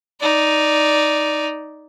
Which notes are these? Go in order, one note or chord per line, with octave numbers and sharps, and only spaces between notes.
D#4 D5